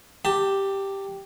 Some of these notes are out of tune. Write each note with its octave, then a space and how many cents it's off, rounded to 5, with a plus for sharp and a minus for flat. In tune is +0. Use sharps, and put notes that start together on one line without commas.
G4 +0 A5 +25